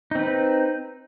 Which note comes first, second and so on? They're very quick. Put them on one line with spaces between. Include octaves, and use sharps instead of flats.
D#4 C4 B4